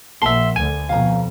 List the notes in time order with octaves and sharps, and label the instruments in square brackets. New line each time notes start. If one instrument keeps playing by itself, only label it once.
[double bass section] A#1 [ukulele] A#4 F#5 A5 [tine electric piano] E5 C6
[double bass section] D2 [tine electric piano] G#5
[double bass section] F2 B2 [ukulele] F5 A#5